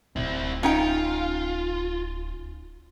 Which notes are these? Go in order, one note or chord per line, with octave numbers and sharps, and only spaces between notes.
D1 C4 E4
C#4 D#4 F4 G5